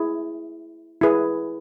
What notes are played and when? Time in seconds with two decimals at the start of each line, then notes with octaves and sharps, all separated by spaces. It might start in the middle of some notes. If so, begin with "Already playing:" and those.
Already playing: E4 G#4
1.01 E4 G#4 B4